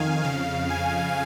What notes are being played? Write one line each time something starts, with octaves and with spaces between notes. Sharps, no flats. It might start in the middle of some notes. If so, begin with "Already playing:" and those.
Already playing: F2 D#3 F5 G#5
F2 C#3 F5
G#5